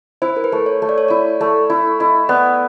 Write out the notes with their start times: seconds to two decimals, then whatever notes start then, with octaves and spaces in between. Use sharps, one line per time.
0.22 E4 C5
0.37 A#4
0.44 B4
0.52 A3
0.66 C#5
0.82 A3
0.89 D5
0.98 C#5
1.08 E4 D5
1.41 A3
1.70 E4
2.00 E4 D#5
2.29 B3 D5